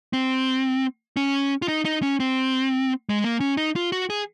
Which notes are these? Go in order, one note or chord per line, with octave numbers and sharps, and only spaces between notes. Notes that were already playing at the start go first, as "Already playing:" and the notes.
C4
C#4
F4
D#4
D#4
C#4
C4
G#3
A#3
C#4
D#4
F4
F#4
G#4